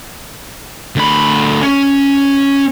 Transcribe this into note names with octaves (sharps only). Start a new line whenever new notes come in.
D2 B5
C#4